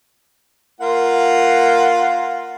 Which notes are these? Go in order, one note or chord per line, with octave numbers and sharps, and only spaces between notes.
A#3 F4 F#5